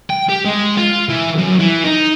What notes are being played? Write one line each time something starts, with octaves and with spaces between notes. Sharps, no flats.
G5
G4
G#3
F4
E3
F#2
E3
D#4